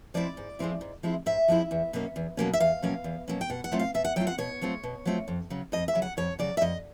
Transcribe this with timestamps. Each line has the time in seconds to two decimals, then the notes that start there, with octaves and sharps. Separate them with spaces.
0.14 F3 G#3 C4 E4 D5
0.37 G#2
0.59 F3 G#3 C4 E4
0.81 G#2
1.03 F3 G#3 C4 E4
1.26 G#2 E5
1.48 F3 G#3 C4 E4
1.71 E2
1.93 B2 F#3 A#3 C#4
2.16 E2
2.37 B2 F#3 A#3 C#4
2.53 E5
2.60 E2 F5
2.82 B2 F#3 A#3 C#4
3.04 E2
3.28 B2 F#3 A#3 C#4
3.41 G5
3.50 B2 F#5
3.64 F#5
3.72 F#3 A3 C4 F4
3.80 F5
3.94 B2 E5
4.05 F#5
4.16 F#3 A3 C4 F4 G5
4.27 F#5
4.38 B2 C#5
4.61 F#3 A3 C4 F4
4.83 B2
5.05 F#3 A3 C4 F4
5.28 F2
5.50 C#3 F#3
5.72 F2 D#5
5.88 E5
5.95 C#3 F#3
6.02 F#5
6.17 F2 C#5
6.39 C#3 F#3 D5
6.57 E5
6.61 F2 D#5